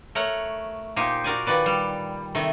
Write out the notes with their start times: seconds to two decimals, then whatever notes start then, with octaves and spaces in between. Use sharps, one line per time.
0.15 A3 A#4 C#5 F#5
0.96 A#2 D#4 G4 C5 G#5
1.24 F#4 A#4 D5 G#5
1.47 A#2 D#3 B4 D5
1.66 G3
2.35 C3 D#3 A3